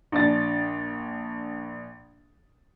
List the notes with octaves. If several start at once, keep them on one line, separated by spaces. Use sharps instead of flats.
A#1 D4 A6